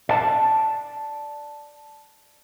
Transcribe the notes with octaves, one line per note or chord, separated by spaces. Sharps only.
D5 A5